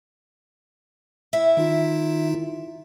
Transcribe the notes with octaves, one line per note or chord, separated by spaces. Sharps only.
E4 E5
D#3 D#4 F4